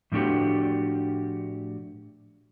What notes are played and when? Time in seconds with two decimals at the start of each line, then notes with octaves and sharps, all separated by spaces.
0.12 A2 F3 A3 D4 F#4 G4